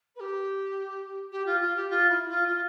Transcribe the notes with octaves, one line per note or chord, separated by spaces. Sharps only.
B4
G4
G4
F4
F4
G4
F4
E4
F4
F4